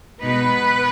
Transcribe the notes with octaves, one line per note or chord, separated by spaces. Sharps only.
B2 G#3 B3 D#4 B4